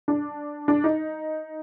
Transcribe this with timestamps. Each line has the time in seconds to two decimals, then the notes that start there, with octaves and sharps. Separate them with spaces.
0.08 D4
0.68 D4
0.84 D#4